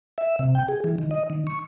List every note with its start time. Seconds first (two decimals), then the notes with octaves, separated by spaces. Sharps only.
0.18 E5
0.39 C3
0.55 G5
0.68 G#4
0.84 E3
0.98 D#3
1.11 D#5
1.30 D#3
1.47 C#6